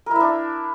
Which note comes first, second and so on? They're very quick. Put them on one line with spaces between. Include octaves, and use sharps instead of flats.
A#4 E4 E5 D4